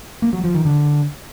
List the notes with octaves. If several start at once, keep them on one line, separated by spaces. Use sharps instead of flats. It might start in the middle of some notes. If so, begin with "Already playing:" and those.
A#3
F#3
F3
D#3
D3